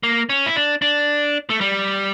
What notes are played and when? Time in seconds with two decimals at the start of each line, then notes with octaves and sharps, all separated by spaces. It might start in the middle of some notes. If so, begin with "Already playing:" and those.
0.03 A#3
0.29 C#4
0.46 E4
0.56 D4
0.82 D4
1.50 A3
1.61 G3